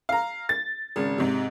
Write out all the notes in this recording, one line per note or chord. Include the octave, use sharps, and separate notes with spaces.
F5 A#5
A6
G#1 C#3
G#2 C3